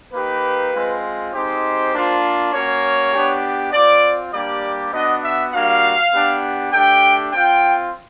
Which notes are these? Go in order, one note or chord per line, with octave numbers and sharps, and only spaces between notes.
A#3 D#4 G4 B4
G#3 C4 F4
G#3 C4 D#4 G4 C5
A#3 D4 F4
A#3 C#4 F#4 C#5
B3 D4 G4
C4 F4 D5
G3 A#3 D4 G4 D5
B3 D4 F#4 D#5
E5
G3 A#3 D4 F#4 F5
B3 D4 G4
A3 D4 G4 G5
C4 F4 G5